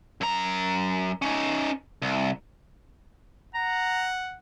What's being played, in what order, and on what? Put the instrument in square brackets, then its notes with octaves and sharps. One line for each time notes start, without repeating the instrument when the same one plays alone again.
[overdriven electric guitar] F#2 A#5
C#4 D#4
C2
[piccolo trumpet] F#5 [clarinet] A#5